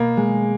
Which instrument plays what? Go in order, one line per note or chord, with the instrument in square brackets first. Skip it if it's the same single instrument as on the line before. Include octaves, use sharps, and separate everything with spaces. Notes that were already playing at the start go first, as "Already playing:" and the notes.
Already playing: [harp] B2 B3 [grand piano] A#3
[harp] G#3